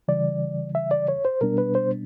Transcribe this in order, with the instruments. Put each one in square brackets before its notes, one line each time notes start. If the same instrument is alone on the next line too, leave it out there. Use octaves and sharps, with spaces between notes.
[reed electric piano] C#3 E3 G3 D5
E5
D5
C#5
C5
B2 G3 B3 D4 A#4
B4
C5